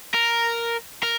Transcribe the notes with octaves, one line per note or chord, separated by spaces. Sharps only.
A#4
A#4